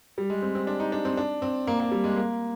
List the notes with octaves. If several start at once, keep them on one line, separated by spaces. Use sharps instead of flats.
G3
G#3
C4
C4
D4
D#4
D4
C4
D4
C4
A#3
A#3
G3
G#3
A#3